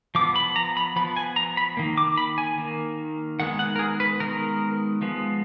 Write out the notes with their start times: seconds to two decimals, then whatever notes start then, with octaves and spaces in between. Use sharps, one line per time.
0.15 F3 B3 D6
0.36 B5
0.56 A#5
0.77 B5
0.96 F3 B3 B5
1.16 G#5
1.36 A#5
1.57 B5
1.77 D#3 A#3
1.98 D6
2.17 B5
2.38 G#5
2.58 D#3 A#3
3.40 D#3 G#3 B3 F#5
3.59 F#5
3.76 A#4
3.79 G#4
4.00 B4
4.20 D#3 G#3 B3 A#4
5.02 F3 G#3 B3